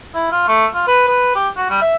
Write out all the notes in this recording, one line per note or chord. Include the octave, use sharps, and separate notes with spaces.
E4
F4
A3
F4
B4
B4
G4
F#4
G3
E5